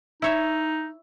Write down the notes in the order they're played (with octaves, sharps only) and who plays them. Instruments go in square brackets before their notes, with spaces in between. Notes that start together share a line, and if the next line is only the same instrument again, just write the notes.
[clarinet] D#4 [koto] E4 C#5 E5